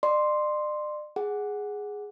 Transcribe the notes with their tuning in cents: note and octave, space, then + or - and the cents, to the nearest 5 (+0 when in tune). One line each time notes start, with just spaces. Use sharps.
D5 +40 C6 +0
G#4 +0 F#5 +0